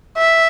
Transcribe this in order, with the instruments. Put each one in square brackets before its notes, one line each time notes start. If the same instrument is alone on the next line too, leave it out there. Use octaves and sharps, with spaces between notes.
[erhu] E5